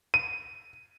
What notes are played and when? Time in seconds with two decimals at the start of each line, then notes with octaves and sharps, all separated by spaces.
0.14 D#7